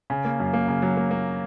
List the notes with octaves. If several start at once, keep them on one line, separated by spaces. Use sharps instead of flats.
C#3
A#3
F#2
A#3
C#3
F#3
A#3
A#3